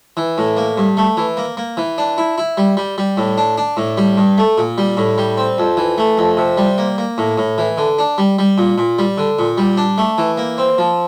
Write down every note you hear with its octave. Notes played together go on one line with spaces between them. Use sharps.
E3
A2
A#3
G2
A3
E3
A#3
A#3
E3
D4
E4
E4
G3
G3
G3
A2
D4
D4
A2
G3
G2
A3
A#2
G3
A2
G3
C4
F2
E3
A3
F2
C3
G3
A#3
A#3
A2
A2
E3
D3
D4
G3
G3
A#2
A#2
G3
D3
A#2
G3
D4
A3
E3
A#3
C4
F3